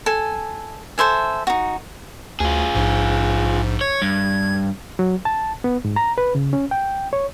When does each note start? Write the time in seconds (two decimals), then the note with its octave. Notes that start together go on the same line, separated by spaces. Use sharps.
0.06 A4 G#5
0.98 A4 C5 E5 G#5
1.47 D#4 F#4
2.40 D2 F4 G#4
2.75 A#1 G#2
3.81 C#5 G#6
4.02 G2
4.99 F#3
5.25 A5
5.64 B3
5.85 G#2
5.96 A#5
6.18 B4
6.35 C#3
6.53 C#4
6.71 G5
7.13 C#5